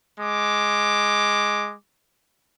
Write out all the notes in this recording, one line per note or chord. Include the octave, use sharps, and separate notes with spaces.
G#3 D6